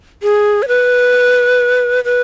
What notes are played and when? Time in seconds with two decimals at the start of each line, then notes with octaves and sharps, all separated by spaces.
0.23 G#4
0.62 C#5
0.68 B4
2.04 B4